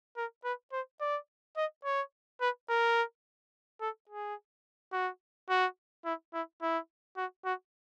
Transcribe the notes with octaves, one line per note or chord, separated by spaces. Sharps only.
A#4
B4
C5
D5
D#5
C#5
B4
A#4
A4
G#4
F#4
F#4
E4
E4
E4
F#4
F#4